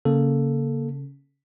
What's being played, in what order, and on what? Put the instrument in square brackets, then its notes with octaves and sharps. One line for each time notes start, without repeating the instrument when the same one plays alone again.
[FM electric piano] C#3 [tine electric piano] A#3 A4